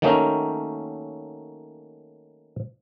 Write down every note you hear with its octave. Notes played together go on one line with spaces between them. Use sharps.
D#3 F#3 A3 A#3 C#4 D#4